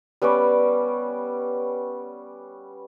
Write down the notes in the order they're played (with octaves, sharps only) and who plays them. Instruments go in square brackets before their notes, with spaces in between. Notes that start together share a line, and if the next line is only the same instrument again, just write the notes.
[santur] G3 B3 C#4 D5